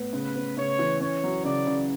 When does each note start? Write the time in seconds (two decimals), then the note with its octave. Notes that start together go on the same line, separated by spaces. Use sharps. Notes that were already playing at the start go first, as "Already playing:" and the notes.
Already playing: A2 B3
0.13 C#3 B4
0.35 B3
0.57 C#3 C#5
0.79 E3
1.01 C#4 C#5
1.23 F#3
1.45 C#3 D5
1.67 C#3